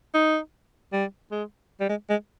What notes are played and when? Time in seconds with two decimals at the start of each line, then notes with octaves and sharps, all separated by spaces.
0.14 D#4
0.93 G3
1.31 G#3
1.80 G3
1.89 G#3
2.09 G#3